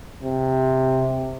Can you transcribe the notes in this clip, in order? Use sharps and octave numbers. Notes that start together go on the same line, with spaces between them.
C3